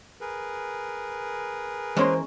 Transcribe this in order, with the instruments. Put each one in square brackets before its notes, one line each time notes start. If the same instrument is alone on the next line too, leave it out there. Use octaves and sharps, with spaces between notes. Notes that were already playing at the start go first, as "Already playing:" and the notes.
[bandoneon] G#4 A#4 B4
[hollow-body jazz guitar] E3 A#3 C6 [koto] G#3 C#4 [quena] C5